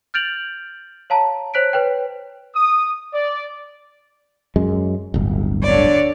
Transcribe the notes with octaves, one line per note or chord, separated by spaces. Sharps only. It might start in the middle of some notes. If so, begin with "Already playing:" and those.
F6 G6 A6 D7 F7 F#7
C#5 F5 A5 A#5
C5 C#5 F#6 B6 D7
B4 C#5 G5
D#6
D5
F#2 G#3
D1 G1
D3 C#5 D5